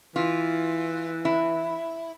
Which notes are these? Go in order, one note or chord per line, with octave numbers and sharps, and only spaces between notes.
E3 F4
E4